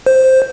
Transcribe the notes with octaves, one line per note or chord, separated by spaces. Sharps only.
C5